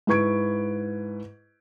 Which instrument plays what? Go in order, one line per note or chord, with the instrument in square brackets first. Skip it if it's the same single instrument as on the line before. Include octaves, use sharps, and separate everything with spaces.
[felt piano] G#2 E4 B4 C#6 G#6 D7